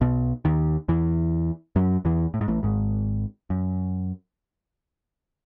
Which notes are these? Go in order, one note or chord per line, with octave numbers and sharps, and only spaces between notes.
B1 B2
D#2 D#3
E2 E3
F#2 F#3
E2 E3
A2
G#2
A1 A2
G#1 G#2
F#2